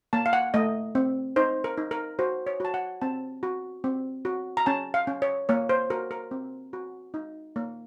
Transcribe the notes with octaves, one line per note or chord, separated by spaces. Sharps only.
A#3 A5
F5
F#5
A3 D#5
C4
D#4 C5
A#4
D#4
A#4
F#4 C5
C#5
F#4 A5
F#5
C4 A5
F#4
C4
F#4
A#5
C#4 A5
F5
C#4
C#5
A#3 C#5
C5
F#4 A#4
A#4
C4
F#4
D#4
A#3